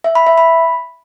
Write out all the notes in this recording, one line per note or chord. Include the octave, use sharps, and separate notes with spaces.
E5
B5
E5
B5